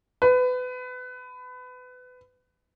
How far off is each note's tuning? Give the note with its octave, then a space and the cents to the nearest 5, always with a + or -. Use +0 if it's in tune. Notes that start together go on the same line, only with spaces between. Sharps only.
B4 +25